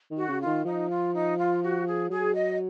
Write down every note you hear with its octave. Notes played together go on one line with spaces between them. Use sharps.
D#3
F#4
C#3
F4
D#3
F3 D#4
F4
D#4
F4
F#4
G#4
F#3 G#4
D#5